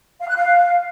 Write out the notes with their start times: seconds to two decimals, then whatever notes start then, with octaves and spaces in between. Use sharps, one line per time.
0.20 F5
0.28 F#6
0.36 F5